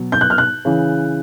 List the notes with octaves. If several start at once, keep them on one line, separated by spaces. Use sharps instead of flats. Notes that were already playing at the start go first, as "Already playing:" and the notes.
Already playing: B2 F#3
G6
F#6
F6
F#6
C#3 E3